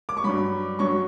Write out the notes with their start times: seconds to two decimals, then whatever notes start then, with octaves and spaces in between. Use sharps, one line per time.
0.09 D6
0.17 C#6
0.24 G2 F#3 B5
0.79 G2 F#3 C#6